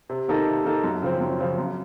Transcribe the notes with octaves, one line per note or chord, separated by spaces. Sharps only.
C3
D#3 A#3 D#4 A4
C3
D#3 A#3 D#4 A4
F#2
C#3 F3 C4
F#2
C#3 F3 C4
F#2